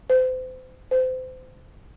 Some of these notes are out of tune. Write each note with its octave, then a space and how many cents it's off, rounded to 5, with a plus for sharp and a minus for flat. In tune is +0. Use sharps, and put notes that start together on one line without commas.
C5 -35
C5 -30